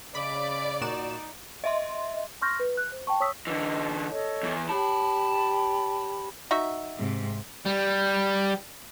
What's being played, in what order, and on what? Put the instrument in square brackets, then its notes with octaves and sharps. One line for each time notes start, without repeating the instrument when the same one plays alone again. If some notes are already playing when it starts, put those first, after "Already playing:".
[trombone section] C#3 [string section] D5 [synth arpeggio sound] D#5 B5 [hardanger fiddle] D6
[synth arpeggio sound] A#2 F#4 E7 [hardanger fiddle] D#4
[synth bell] D#5 E5 C6
[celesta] C6 C#6 F6 G6 A#6
B4
F#6
C5
G5 A5 C#6
C#5 C#6 D#6 E6 B6
[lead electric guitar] D3 E3 [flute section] D#5 E6
[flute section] A4 C#5 D#5
[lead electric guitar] E2 E3
[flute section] G4 B5 [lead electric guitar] C#5 A5
[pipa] D#4 F#4 E5
[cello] G#2 C3
[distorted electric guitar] G3